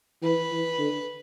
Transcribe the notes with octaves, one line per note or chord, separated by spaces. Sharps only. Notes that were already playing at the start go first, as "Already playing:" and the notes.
E3 B4
E3
D3